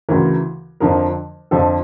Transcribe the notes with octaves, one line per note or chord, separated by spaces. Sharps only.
D2 C#3 E3 A#4
F2 D3 F3 A#4
F2 D3 F3 A4